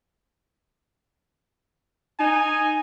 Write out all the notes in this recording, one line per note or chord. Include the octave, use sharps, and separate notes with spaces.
D#4 G#5